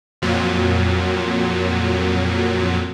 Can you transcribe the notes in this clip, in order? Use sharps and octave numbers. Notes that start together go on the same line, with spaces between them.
F2 A#2 F#3